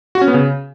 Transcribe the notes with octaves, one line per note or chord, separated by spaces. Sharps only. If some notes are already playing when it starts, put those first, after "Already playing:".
F#4
C#4
B3
C#3